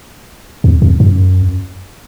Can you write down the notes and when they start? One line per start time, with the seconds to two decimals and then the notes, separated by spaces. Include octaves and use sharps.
0.64 E2
0.82 F2
1.00 F#2